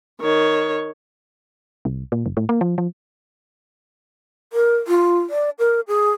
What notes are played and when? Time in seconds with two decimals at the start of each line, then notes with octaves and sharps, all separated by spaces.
0.21 D#3 C#5
1.85 C2
2.12 A#2
2.26 F#1
2.37 A2
2.49 A#3
2.61 F3
2.78 F3
4.53 A#4
4.88 F4
5.30 D5
5.59 A#4
5.88 G#4